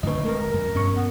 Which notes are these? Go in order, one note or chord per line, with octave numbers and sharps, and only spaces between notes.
D#2 D3 A3 C4 B4 D#5
D1 G#3 A#4
F2
G2 B2 C#4 C#6
B3